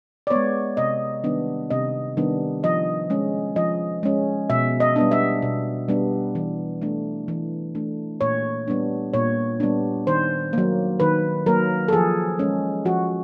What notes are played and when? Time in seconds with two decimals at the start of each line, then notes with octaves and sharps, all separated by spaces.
0.27 D5
0.31 G#3 B3 C#5
0.77 C3 D#5
1.24 D#3 G3 B3 D4
1.71 C3 D#5
2.17 D#3 G3 B3 D4
2.63 F3 D#5
3.10 G#3 C#4
3.56 F3 D#5
4.03 G#3 C#4
4.50 B2 E5
4.80 D#5
4.96 G3 B3 D4
5.11 E5
5.42 B2
5.88 G3 B3 D4
6.35 E3
6.82 A3 D4
7.28 E3
7.75 A3 D4
8.21 A#2 C#5
8.68 G3 B3 D4
9.14 A#2 C#5
9.60 G3 B3 D4
10.07 D#3 C5
10.53 F#3 A#3
11.00 D#3 B4
11.46 F#3 A#3 A#4
11.88 A4
11.93 F3 G#4
12.39 G#3 C#4
12.85 F3 F#4